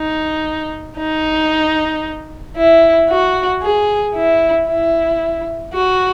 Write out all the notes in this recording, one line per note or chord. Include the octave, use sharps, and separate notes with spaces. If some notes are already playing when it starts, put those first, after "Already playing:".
Already playing: D#4
D#4
E4
F#4
G#4
E4
E4
F#4